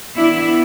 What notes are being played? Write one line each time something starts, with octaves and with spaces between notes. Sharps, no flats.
E3 B3 D4 E4